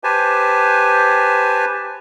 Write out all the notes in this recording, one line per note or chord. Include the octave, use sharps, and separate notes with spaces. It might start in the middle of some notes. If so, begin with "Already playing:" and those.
G4 B4 C5 G#5 A5